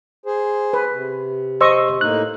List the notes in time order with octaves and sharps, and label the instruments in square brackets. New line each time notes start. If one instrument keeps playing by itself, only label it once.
[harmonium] G#4 C5
[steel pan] B4
[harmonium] C3
[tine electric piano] C5 C6 E6 [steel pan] D#5 C#6
[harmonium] A2 A#3 D#4 [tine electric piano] F#6